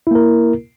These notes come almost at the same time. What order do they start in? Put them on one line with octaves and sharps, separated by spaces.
E4 A#3 A#4